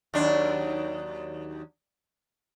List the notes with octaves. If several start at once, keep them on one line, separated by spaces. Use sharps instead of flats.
D#2 F#3 D4